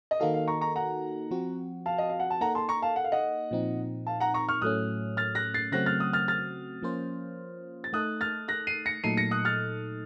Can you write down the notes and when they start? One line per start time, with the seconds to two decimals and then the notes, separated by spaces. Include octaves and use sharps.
0.11 D#5
0.20 D#3 A#3 D#4 F#4 A4 F5
0.34 F5
0.47 A#5 C#6
0.61 A#5 C#6
0.76 F#5 A#5
1.31 F3 C4 F#4
1.86 F5 A5
1.98 D#5
2.09 F5
2.20 F#5
2.30 A5
2.41 A#3 D#4 A4 F#5 A#5
2.55 A5 C6
2.69 A#5 C#6
2.82 F5 A5
2.96 F#5
3.04 F5
3.12 D#5 F#5
3.51 A#2 F3 C4 D#4
4.07 F5 A5
4.20 F#5 A#5
4.34 A#5 C#6
4.49 C#6 F6
4.62 A2 F#3 A3 C#4 D#6 F#6
5.17 F6 A6
5.35 F#6 A#6
5.54 A6 C7
5.72 C#3 F#3 A3 C4 F#4 F#6 A#6
5.86 F6 A6
6.00 D#6 F#6
6.13 F6 A6
6.28 F6 A6
6.82 F3 A#3 C#4 F4 C5
7.84 A6
7.93 A3 D#4 A4 D#6 F#6
8.21 F6 A6
8.48 F#6 A#6
8.67 C7 D#7
8.86 A#6 C#7
9.04 A#2 F#3 A3 D#4 A4 C7 D#7
9.17 A#6 C#7
9.31 D#6 F#6
9.45 F6 A6